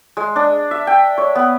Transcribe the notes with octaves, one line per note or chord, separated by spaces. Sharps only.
G#3
D4
E5
G5
C#5
B3